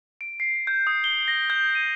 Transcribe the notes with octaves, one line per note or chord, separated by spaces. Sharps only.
D7
C7
G6
D#6
G7
A#6
G6
D#7